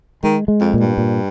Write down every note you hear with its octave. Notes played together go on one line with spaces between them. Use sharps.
D#3 G#3
G#3
F2
A#2
G2
A#2